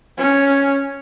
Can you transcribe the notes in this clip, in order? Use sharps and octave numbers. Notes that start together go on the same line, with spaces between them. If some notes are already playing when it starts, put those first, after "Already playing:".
C#4